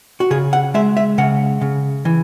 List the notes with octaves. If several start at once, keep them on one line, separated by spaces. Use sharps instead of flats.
F#4
C#3 G#4
F#5
G#3 E5
E5
C#3 F#5
C#3
E3